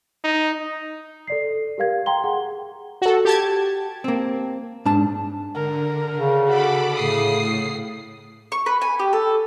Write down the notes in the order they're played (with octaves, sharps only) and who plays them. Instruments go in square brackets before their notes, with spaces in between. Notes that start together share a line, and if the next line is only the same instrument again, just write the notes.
[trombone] D#4
[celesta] A4 D5 C7
G4 A#4 F5 G#6
G5 A#5 C6 G7
G#4 F#5
[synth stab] F#4 A4
G4 A5 G#6
[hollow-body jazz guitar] A#3 C4
G#2 D4 A5
[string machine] D3 [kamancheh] A#4
[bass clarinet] C#3
[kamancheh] F#4 G#4 [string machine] A4 B5 D6
[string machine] A2 C7 [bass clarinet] C#3 [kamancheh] D#6
[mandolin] C#6
B4
G#5
G4
A4